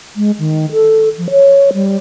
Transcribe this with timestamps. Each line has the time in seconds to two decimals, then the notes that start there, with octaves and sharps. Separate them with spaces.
0.16 G#3
0.39 D#3
0.73 A4
1.18 F3
1.31 C#5
1.74 G3